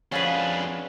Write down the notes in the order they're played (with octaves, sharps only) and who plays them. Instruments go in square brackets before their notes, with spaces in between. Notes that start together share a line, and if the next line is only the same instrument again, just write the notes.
[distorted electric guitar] F2 D4 [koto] C#4 G#4 B4 [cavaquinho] F4 F#4 F5